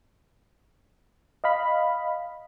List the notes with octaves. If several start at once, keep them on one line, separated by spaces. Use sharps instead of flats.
D#5 F5 B5